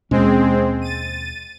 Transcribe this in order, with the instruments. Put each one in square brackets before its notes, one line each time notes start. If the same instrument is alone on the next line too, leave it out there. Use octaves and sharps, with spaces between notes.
[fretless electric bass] D#2 B2 C#4 [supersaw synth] G#3 C4
[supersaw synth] A6 D#7